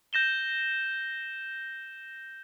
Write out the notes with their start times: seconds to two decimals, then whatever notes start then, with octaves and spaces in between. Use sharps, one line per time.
0.13 G6 A#6 E7 G7